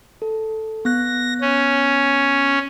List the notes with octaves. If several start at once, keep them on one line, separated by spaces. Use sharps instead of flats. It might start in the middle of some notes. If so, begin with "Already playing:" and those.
A4
B3 F#6 A#6
C#4